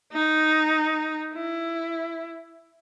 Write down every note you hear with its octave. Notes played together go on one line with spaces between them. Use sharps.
D#4
E4